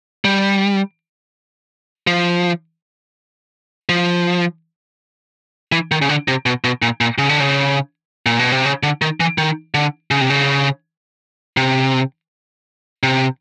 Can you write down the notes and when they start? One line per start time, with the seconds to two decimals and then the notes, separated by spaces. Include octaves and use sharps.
0.25 G3
2.07 F3
3.89 F3
5.72 E3
5.91 D#3
6.02 C#3
6.09 D3
6.28 C3
6.46 B2
6.64 B2
6.82 A#2
7.01 A#2
7.18 C#3
7.29 D3
7.40 C#3
8.26 A#2
8.39 B2
8.52 C3
8.65 C#3
8.83 D3
9.02 D#3
9.20 E3
9.38 D#3
9.74 D3
10.11 C#3
10.21 C3
10.30 C#3
11.57 C3
13.03 C3